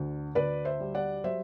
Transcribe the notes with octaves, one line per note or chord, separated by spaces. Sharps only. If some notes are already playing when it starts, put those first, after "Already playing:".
Already playing: D2 D3
D2 B4 D5
C5 E5
G3
D5 F#5
F#3 C5 E5